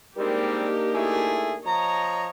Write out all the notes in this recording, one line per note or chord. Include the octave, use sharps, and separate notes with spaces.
G3 G#3 A#3 C4 D4 D#4 G4 A#4
A3 E4 G#4
F3 C#5 D#5 A#5